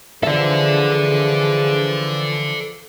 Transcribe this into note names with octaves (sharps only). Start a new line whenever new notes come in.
D3 E3 F3 G#4 A4 D5 E5